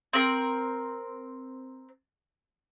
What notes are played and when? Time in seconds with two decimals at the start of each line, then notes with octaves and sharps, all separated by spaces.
0.13 C4 A#4